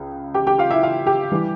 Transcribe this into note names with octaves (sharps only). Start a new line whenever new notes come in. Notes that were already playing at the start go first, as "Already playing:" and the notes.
Already playing: C#2 C#3
G4 G5
G4 G5
F4 F5
E4 E5
F4 F5
G4 G5
E3 G3